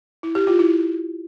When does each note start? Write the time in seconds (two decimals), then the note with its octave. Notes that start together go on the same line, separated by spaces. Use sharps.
0.23 E4
0.35 G4
0.47 F4
0.59 E4